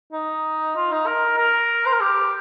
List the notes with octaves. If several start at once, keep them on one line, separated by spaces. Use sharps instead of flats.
D#4
F4
D#4
A#4
A#4
C5
A#4
G4